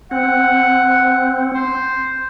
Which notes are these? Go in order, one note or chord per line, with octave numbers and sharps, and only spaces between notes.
C4 F#5
C5